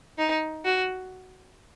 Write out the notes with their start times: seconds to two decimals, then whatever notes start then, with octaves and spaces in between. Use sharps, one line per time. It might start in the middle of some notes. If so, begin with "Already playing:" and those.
0.18 D#4
0.65 F#4